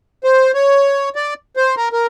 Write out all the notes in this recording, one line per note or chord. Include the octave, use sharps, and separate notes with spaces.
C5
C#5
D5
C5
A#4
A#4